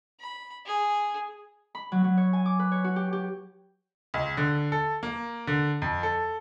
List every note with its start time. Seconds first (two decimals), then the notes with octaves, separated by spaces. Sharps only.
0.20 B5
0.66 G#4
1.75 B5
1.92 F#3
2.04 F#3
2.17 C#5
2.33 G#5
2.46 D6
2.59 B4
2.72 C#5
2.84 F#4
2.96 G4
3.13 G4
4.14 C#2
4.37 D3
4.72 A4
5.03 A#3
5.47 D3
5.82 F2
6.03 A4